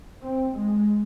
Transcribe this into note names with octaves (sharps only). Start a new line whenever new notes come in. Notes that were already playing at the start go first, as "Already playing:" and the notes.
C4
G#3